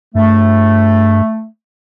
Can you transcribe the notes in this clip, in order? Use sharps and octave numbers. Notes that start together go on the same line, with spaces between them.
G2 A3